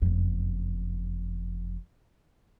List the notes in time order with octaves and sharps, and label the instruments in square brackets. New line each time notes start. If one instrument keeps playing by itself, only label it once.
[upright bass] F#1 F2